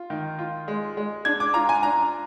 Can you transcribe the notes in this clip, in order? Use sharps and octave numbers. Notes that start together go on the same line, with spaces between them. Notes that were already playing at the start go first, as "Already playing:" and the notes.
Already playing: F4
D#3
F4
G#3
G#3
D4 G#6
D6
F4 A#5
G#5
D4 A#5